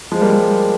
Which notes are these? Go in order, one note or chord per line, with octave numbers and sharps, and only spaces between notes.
F3 G#3
G3 A#3
G3 A#3